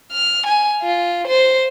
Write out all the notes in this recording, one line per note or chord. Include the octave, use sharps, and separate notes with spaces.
F6
G#5
F4
C5